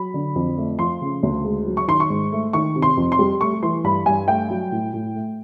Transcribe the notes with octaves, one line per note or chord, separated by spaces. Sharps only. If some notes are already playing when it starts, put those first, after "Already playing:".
Already playing: F#3 B5
D3
F2
A3
F3 C6
C#3
D2
G#3
F#3
C#6
D#3 C6
C#6
G#2
A3
D#3 C#6
C3
C6
F2
C6
G3
A3 C#6
E3 C6
G2 B5
G2 G#5
A3 G5
F#3
A2
A2
A3